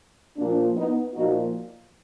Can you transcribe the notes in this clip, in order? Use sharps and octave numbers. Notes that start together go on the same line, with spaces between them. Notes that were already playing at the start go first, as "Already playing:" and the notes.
A#2 F3 A#3 D4
B3 D#4
A#2 F3 D#4 F#4